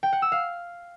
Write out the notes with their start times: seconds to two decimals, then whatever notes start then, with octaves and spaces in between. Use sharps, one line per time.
0.03 G5
0.13 F#5
0.22 E6
0.32 F5